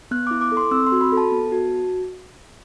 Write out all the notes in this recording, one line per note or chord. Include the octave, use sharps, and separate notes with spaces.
B3 F#6
E4 D6
D6
A4
C6
C4 E6
C6
F#4
B5
A4
A5
B3
F#4